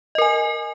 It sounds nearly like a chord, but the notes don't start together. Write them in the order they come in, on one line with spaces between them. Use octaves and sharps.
D#5 A#4 G#5